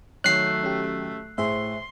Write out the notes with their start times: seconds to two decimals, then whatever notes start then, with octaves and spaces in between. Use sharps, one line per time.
0.24 D#3 F#3 A3 C#5 F#6 G6 B6 C7
0.64 C#4 G4
1.38 A2 G#4 C5 E5 C6